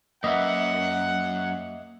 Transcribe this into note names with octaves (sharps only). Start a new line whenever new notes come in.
F#2 A#3 B4 D#5 E5 F#5